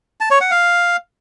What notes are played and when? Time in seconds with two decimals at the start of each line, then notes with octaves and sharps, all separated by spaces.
0.20 A5
0.31 C#5
0.41 F#5
0.51 F5